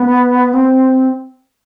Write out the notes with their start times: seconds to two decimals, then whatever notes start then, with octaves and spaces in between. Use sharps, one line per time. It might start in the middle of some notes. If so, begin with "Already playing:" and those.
Already playing: B3
0.53 C4